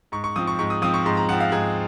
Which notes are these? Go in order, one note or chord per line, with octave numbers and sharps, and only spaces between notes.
G#2 C#6
C#6
F3 C4 D#6
C#6
G#2 C#6
D#6
F3 C4 D#6
C#6
G#2 C6
A#5
F3 C4 F#5
F5
G#2 G#4